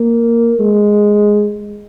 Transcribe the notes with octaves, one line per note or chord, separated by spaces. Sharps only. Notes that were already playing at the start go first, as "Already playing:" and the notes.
Already playing: A#3
G#3